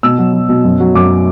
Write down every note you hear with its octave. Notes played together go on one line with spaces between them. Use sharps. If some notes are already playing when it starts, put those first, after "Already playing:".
B2 E6
F#3
F#3
B2
F#2
F#3
F#2 D6